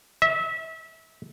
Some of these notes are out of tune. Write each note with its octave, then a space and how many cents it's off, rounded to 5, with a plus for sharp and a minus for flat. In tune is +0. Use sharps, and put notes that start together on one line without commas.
E5 -25